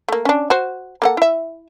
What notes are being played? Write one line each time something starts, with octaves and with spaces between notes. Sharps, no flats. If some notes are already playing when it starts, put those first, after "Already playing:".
A3 A#3
C#4 D4
F#4 C5
A#3 A4 F#5
E4 E5